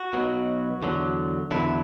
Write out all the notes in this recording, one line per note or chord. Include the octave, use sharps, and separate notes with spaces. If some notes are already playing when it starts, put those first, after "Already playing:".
Already playing: F#4
B1 B2 F#3
E2 D3 F#3
E2 D3 F#3 E4